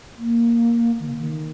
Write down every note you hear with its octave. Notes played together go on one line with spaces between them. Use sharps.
A#3
D#3
C#3
D#3